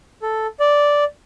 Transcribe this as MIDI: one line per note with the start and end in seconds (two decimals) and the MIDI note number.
0.22 0.47 69
0.60 1.04 74